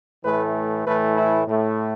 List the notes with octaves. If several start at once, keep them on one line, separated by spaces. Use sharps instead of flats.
A2 E3 A3 B4
A2 E3 A3 B4
E4
A2 A3